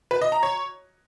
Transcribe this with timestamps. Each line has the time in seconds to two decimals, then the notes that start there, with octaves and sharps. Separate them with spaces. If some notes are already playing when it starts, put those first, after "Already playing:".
0.11 B4
0.21 D#5
0.32 A#5
0.43 C#5